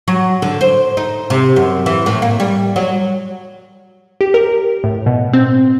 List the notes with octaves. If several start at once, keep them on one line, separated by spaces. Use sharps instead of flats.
F#3
D3
C5
D#4
C3
F#2
E3
A2
A#3
G3
F#3
G4
A#4
A2
B2
C4